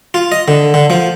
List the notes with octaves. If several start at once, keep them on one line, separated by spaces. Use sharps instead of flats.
F4
D#5
D3
D3
F3